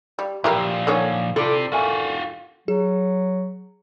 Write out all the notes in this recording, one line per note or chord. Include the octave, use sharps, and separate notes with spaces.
G3
A#2 F3 E4 G4 A#4
D3 D#3 C#4 A4 C#5
C3 E4 F4 A4 D5
F4 F#4 A#4 E5 G#5
F#3 G#4